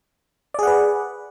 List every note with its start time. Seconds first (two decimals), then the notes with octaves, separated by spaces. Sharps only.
0.54 D5
0.59 G#4
0.63 F#5
0.67 B4